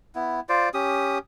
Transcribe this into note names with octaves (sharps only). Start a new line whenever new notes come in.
B3 E4
F4 C5 D5
C#4 G4 D#6